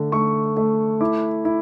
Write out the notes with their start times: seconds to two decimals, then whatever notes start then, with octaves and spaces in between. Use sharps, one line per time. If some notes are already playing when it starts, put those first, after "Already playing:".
Already playing: D3 A3
0.12 A3 C#6
0.57 A3
1.01 E4 D6
1.45 E4